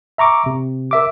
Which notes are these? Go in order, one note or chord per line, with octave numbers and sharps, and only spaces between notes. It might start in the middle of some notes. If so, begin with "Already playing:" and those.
E5 A#5 C#6 D6
C3
A#4 E5 D6